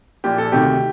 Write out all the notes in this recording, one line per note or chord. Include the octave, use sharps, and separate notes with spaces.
A#1 A#2 G4
A4
D2 C3 D#3 G4